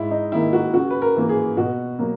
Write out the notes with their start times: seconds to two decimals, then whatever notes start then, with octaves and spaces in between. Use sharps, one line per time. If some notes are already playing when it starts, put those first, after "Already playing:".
Already playing: G#2 E4
0.11 D#4
0.32 D#3 A#3 E4
0.53 F#4
0.74 C#3 F#4
0.91 B4
1.02 A#4
1.16 E3 A#3
1.29 G#4
1.57 B2 F#4
1.99 F#3 A#3